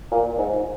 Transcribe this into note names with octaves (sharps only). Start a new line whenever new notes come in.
A#2
G#2